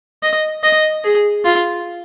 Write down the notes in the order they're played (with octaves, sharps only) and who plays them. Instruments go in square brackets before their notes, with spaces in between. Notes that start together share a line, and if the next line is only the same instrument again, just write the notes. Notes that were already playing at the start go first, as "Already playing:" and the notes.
[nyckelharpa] D#5
D#5
G#4
F4